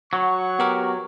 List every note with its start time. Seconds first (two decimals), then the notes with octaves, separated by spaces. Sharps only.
0.13 F#3 F#5 C#6
0.59 B3 G4 A#4